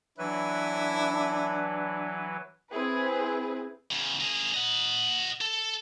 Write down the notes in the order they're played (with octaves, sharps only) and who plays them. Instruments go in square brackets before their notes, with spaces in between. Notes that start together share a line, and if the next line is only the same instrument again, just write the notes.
[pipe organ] E3 F#3 B4 [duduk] D4 [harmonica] E4
[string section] C4 E4 G#4 B4
[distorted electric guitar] E2 C#3
A#3 G#4
D#5 F#5
A4